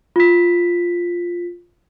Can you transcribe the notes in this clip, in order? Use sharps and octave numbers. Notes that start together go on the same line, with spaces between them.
F4 B6